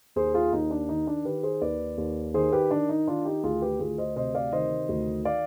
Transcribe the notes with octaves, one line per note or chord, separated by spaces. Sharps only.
D#2 G#4 C5
F4 G#4
D#2 D#4
D4
D#3 D#4
D4
D#3 G4 B4
G#4 C5
D#2 B4 D5
D#2
D#3 G#4 C5
G4 B4
D#3 D4
D#4
D#3 D4 F4
D#4 G4
D2 F4 G#4
G4 B4
D2 F4 G#4
C5 D#5
C3 C5 D#5
D5 F5
D#3 C5 D#5
D2
D5 F5